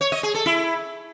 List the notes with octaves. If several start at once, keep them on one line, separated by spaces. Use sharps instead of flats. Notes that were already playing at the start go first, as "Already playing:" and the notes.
C#5
D#5
G#4
A4
E4